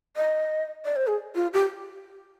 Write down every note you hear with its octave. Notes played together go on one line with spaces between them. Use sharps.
D#5
D5
C5
G#4
F4
G4